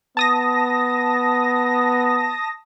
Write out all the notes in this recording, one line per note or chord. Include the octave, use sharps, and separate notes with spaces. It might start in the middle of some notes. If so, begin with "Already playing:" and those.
B3 A5 D#6 A#6